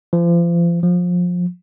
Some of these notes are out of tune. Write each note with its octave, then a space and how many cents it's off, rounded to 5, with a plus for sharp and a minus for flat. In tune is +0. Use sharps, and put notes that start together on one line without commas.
F3 -35
F3 +25